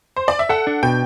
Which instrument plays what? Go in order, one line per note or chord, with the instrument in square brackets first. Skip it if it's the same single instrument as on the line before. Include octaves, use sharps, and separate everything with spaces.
[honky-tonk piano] C5
D5
E5
[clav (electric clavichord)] A4 [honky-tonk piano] F#5
[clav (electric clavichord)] D4
[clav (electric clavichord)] B2 [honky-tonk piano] G5